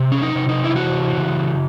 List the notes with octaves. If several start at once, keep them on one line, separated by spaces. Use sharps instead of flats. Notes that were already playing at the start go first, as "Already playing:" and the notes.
Already playing: C3
C#4
D#4
C3
D#4
E4
E3 F#4
C#3